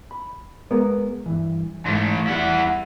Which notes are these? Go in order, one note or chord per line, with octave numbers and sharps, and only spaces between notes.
B5
G#3 B3 A#4
G2 E3
G#2 E3 A3 C6
E2 G3 E4 F#5